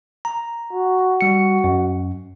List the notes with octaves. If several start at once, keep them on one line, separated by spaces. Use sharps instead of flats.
A#5
F#4
G3 C#7
F#2